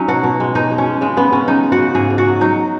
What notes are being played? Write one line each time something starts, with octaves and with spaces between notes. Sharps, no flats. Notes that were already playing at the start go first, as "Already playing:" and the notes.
Already playing: F#3 C#4 D#4
B2 F#4
B2
G#3
B2 D#4
G#3
C#4
G#3
C#3 G#3
C#3 B3
C#3 C#4
G#3 D#4
G#3
F#4
C#3
G#2 G#4
G#2
F#4
F#3
F#3 D#4